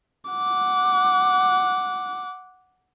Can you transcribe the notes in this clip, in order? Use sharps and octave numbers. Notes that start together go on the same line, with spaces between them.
F#5 D6